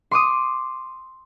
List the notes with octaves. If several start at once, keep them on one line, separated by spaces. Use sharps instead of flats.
C6 D6 D#6